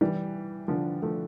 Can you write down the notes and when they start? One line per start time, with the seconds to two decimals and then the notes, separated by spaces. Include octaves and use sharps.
0.01 E3 G3
0.68 D3 F3
1.02 F3 A3